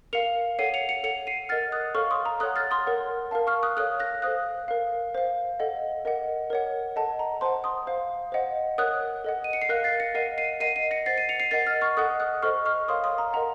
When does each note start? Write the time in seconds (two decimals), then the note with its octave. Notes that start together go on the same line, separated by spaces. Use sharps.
0.13 A#4 F5 C#7 F7
0.59 A4 C#5 F#5 C7 D#7
0.74 C#7 F7
0.89 C#7 F7
1.04 A4 C#5 F#5 C#7 F7
1.27 C7 D#7
1.49 A#4 D#5 F#5 F6 A6
1.72 D#6 F#6
1.95 A4 C#5 F5 C#6 F6
2.11 C6 D#6
2.26 A#5
2.40 A4 C#5 F#5 D#6 F#6
2.56 F6 A6
2.71 C6 D#6
2.87 A#4 C#5 F#5
3.31 A#4 F5 A5
3.47 C#6 F6
3.63 D#6 F#6
3.77 A4 C#5 F5 D#6 F#6
4.00 F#6 A#6
4.22 A4 C5 F5 D#6 F#6
4.68 A#4 F5
5.15 C5 F5
5.60 A4 D#5 F#5
6.05 A#4 D#5 F#5
6.50 A#4 C#5 F#5
6.96 A4 D#5 F#5 A5
7.19 A#5
7.41 C5 F#5 A5 C6
7.64 C6 D#6
7.87 C5 F5
8.32 C5 D#5 F#5
8.78 A#4 C#5 F#5 D#6 F#6
9.24 A4 D#5 F#5
9.44 D#7
9.53 C#7
9.61 C7
9.69 A#4 F5 F#6 A#6
9.84 A6 C7
10.00 A#6 C#7
10.15 A#4 D#5 F#5 C7 D#7
10.38 C7 D#7
10.60 A#4 D#5 F#5 C7 D#7
10.76 C7 D#7
10.91 A#6 C#7
11.06 C5 F#5 A6 C7
11.18 C7 D#7
11.29 C#7 F7
11.40 C7 D#7
11.51 A#4 D#5 F#5 A6 C7
11.67 F6 A6
11.81 C#6 F6
11.97 A4 D#5 F#5 D#6 F#6
12.20 D#6 F#6
12.42 A4 C5 D#5 C#6 F6
12.65 C#6 F6
12.88 A#4 C#5 F5 C6 D#6
13.04 C6 D#6
13.18 A#5
13.33 A#4 D#5 F#5 A#5